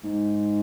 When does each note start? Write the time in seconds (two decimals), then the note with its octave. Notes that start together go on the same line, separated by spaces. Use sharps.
0.04 G#2